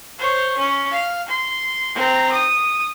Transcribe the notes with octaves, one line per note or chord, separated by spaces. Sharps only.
C5 C#5
C#4
F5
C6
C4 A#5
D#6